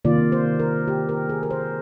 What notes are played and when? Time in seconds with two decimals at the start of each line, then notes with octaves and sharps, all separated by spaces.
0.05 C3 D#3 A#3 F4 D5
0.32 C5
0.60 A#4
0.88 G4
1.09 A#4
1.29 G#4
1.43 A#4
1.51 C5